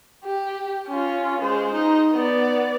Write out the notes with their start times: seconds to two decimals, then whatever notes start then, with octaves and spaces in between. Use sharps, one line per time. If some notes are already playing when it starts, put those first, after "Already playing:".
0.24 G4
0.88 C#4 F4
1.41 G#3 C5
1.72 D#4
2.14 B3 D5